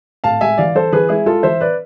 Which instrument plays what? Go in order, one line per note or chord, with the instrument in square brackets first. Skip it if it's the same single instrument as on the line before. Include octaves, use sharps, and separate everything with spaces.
[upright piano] A2 F5 A5
G#3 E5 G#5
E3 D5 F5
E3 A4 C5
E3 G#4 B4
G#3 E4 G#4
G#3 F4 A4
E3 C5 E5
B4 D5